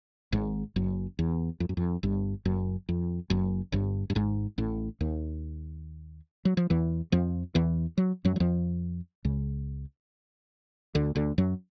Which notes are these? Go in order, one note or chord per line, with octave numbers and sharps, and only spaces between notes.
G#1 G#2
F#1 F#2
E2
F2
F#2
F2
G1 G2
F#1 F#2
F2
F#1 F#2
G1 G2
G2
G#1 G#2
A1 A2
D#2 D#3
F#3
F3
E2 E3
F2 F3
E2 E3
F#3
F#2 F#3
F#3
F2 F3
C#2 C#3
D2 D3
D2 D3
F#2 F#3